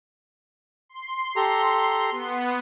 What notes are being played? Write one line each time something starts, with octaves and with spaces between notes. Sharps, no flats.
C6
G4 A4 A#5
B3